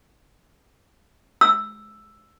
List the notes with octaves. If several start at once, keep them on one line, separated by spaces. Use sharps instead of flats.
E6